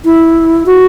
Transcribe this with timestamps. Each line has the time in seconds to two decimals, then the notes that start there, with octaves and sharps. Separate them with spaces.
0.05 E4
0.66 F#4